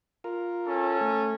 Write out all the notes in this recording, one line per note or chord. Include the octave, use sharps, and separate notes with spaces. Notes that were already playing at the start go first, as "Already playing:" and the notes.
F4 A#4
C#4 A4
A3